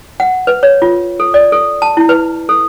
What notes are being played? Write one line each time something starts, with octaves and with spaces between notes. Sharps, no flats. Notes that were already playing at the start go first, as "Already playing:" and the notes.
F#5
B4
C#5
F4
A4
D5
A4
A5
E4
B4
A4